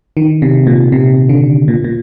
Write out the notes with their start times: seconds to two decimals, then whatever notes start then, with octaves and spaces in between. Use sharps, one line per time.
0.17 D#3
0.42 C3
0.67 A#2
0.92 C3
1.29 D3
1.68 A#2
1.84 A#2